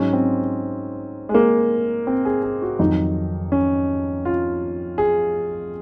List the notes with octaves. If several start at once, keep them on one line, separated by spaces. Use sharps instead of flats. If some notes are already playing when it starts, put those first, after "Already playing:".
Already playing: G#2 F#3 C#4
C4
G#3
A#3
C4
G#4
G#4
F#4
F2 D#3 F#3 D#4
C#4
F4
G#4